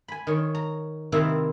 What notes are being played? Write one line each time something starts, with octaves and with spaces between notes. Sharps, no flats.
G#5 B5
D#3 C#5
A#5
C3 D#3 A#3 C4 E4